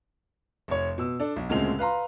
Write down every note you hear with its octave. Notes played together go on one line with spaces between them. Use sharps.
F1 C#5
B2 E6
D4 A4
B1
D2 A#2 C#3 G#3 C4 F7
B4 F5 A#5 C6